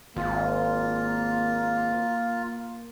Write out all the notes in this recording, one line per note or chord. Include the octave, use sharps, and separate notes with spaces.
G#1 A#3 F4